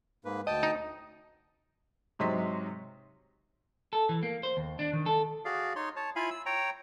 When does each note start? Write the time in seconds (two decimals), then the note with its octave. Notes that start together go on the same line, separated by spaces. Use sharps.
0.25 G#2 A#3 B4
0.47 D2 D#5 G5 A5
0.63 D#4
2.19 G#2 C3 F#3 D#5 C6 B6
3.93 A4
4.09 E3
4.23 A#3
4.43 C5
4.57 D#2
4.79 D4
4.93 D#3
5.06 A4
5.45 F#4 G#4 D5 F5
5.76 D#4 C#5 C6
5.96 C#5 A5
6.16 E4 F4 F5 G#5 B5
6.31 E6
6.46 C#5 G5 A#5